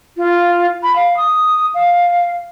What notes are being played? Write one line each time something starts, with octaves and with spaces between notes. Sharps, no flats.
F4
B5
F5
D#6
F5